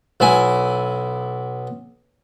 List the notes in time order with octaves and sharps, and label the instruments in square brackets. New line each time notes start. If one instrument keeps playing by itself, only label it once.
[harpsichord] B1 E4 G#5